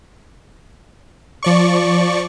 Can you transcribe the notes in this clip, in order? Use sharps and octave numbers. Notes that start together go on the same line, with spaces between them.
F3 D5 C#6